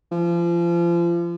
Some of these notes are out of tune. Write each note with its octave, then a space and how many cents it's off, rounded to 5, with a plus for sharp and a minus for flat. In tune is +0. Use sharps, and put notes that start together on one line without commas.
F3 -35